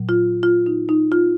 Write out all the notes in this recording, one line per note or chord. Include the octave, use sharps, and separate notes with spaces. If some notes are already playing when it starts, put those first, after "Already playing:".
Already playing: A#2 F#3
F4
F4
D#4
D#4
F4